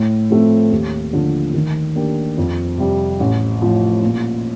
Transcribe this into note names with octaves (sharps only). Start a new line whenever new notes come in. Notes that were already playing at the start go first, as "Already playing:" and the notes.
Already playing: A2
F3 A3 C4
D#2
D3 F3
D#3
A#3 D4 G4
F2
C3 G3
A1
A2 F3
A#2